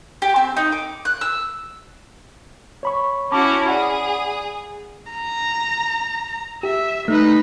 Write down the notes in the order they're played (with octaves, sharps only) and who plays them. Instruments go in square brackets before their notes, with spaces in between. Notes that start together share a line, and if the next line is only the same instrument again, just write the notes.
[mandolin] G4
C4
D#4
D6
F#6
E6
[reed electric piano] C#5 B5 C#6
[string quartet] C#4 E4 F#4 [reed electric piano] A5 B5 D6
[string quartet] G#4 [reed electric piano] D5 F#5 B5
[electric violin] A#5
[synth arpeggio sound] G4 [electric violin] E5
[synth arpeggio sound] A3 [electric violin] D#4 B4